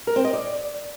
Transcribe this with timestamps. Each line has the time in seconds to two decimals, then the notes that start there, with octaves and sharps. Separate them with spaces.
0.07 A#4
0.16 C4
0.25 D#5
0.33 D5